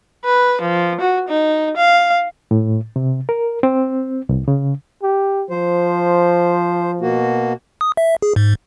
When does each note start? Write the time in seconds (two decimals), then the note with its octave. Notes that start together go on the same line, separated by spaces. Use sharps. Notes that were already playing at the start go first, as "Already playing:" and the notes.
0.25 B4
0.62 F3
1.01 F#4
1.29 D#4
1.77 F5
2.51 A2
2.96 C3
3.29 A#4
3.63 C4
4.29 C2
4.48 C#3
5.03 G4
5.50 F3 C5
7.01 B2 A#3 F#4
7.81 D#6
7.97 E5
8.22 G#4
8.36 G#2